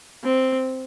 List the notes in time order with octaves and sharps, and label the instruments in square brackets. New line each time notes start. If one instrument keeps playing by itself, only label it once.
[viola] C4